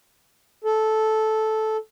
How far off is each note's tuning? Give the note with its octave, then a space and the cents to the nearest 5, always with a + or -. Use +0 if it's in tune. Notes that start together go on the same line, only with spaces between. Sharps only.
A4 -10